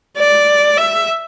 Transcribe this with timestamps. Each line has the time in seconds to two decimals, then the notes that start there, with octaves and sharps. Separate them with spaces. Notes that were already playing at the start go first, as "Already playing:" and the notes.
0.17 D5
0.77 E5